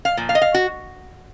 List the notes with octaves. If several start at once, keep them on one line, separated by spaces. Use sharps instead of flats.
F5
A#2 F3
F5
D#5
F5
F#4